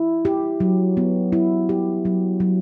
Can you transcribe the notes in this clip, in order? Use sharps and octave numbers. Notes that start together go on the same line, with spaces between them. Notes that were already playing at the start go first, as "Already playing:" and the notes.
Already playing: E4
G4
F#3
B3
E4
G4
F#3
F#3